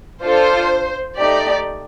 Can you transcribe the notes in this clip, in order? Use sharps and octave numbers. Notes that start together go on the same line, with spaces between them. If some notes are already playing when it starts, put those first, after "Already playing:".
D4 F4 A4 C5
A3 D#4 G4 D5